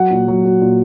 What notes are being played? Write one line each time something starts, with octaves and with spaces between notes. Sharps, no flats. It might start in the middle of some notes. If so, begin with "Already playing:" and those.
Already playing: F#3 F#5
A#2
F#3
F#3
A#2